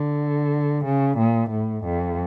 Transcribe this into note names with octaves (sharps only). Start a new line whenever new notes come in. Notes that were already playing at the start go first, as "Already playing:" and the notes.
Already playing: D3
C#3
A#2
A2
F2